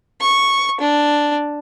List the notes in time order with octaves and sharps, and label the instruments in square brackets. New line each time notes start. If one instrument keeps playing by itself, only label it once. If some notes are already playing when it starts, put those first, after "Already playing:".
[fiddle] C#6
D4